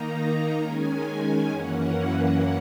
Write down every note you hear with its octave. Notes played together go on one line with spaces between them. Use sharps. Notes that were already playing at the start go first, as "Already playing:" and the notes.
Already playing: D#3 A#3 D#4 A#5
D#3 G#3 C#4 G#5
G#5
F#2 E3 A#3 C#4 F#5
F#5